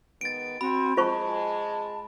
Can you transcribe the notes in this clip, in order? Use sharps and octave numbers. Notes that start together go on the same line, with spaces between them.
D#3 G#3 B3 A6 D7
C4 F#4 B5
G#3 F4 C5 A5 C#6